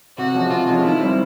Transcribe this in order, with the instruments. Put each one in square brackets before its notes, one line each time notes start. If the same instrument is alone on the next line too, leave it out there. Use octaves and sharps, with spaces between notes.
[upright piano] C3 [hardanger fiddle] F#4
[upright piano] F3 G#3 C#4
[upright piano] C3 [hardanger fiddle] F4
[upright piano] F3 G#3 C#4
[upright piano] D#3 [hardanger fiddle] E4
[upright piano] G3 C4